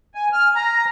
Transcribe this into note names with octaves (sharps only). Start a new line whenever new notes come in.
G#5
F6
A#5